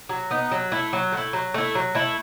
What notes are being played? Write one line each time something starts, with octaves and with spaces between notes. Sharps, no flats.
F#3
B3 D#4
F#3
A3 E4
F#3
A3 E4
F#3
A3 E4
F#3
A3 E4